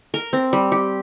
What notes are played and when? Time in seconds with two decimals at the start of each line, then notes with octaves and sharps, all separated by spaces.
0.14 A#4
0.33 C4
0.53 G3
0.72 G4